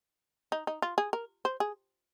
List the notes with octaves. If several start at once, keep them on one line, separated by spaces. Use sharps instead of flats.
D#4
D#4
F4
G#4
A#4
C5
G#4